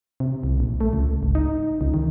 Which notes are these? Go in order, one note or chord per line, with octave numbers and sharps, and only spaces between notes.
C3
C2
A#1
A3
C#2
G#1
D#4
C#2
D#3